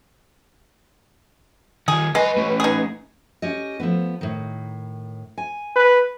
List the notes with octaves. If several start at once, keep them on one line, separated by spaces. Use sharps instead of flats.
D#3 F4 G#4
F#3 G#3 B4 G#5
A2 C#4
D#4 G#4
C#4 G4 D#5
F3 A3 B3
A2 D#3
G#5
B4